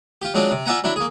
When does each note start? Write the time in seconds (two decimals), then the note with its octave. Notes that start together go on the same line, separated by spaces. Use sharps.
0.22 F4 G4
0.34 F#3 G#3 C4 D4 F4
0.51 C3
0.66 F4 D5 E5 F#5 G#5 A#5
0.84 F#3 D4 E4
0.96 A#3 G#4